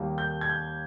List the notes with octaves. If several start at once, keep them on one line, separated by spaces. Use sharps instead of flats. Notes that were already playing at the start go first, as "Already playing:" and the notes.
Already playing: D#2 D#3 G3 A#3
G6
G#6
G6